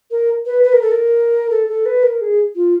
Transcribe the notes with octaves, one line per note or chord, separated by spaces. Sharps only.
A#4
B4
B4
A#4
A4
A#4
A4
A4
B4
A#4
G#4
F4